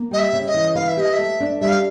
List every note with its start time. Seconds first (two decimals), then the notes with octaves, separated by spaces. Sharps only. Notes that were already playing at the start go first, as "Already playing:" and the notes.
Already playing: A#3
0.11 G3 D#5
0.18 E5
0.33 C#3
0.47 D#5
0.54 E3
0.75 B4 F5
0.88 E5
0.97 G4 D#5
1.13 E5
1.18 A3
1.40 D4
1.61 G3 E5
1.68 F5